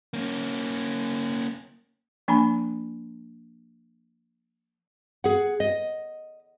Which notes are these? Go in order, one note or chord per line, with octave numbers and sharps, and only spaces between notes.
A#3 C#4
F3 A#3 D4 G#5 A#5 B5
G#4 F#5
D#5